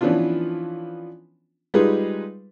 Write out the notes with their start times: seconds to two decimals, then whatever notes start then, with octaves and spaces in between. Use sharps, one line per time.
0.01 E3 F3 B3 C#4 D4 F4
1.74 G3 G#3 D#4 F4 G#4 B4